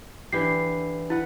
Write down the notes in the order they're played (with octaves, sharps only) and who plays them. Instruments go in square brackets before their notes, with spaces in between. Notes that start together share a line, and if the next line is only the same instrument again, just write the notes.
[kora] D3 E3 G4 [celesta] C7
[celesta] E4 [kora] B4 F#5